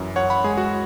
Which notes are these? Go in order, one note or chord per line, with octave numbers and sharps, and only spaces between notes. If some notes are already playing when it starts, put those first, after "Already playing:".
Already playing: F#2 E3
F#2 C#5 F#5
F#5 B5
G#3 G#4
F#4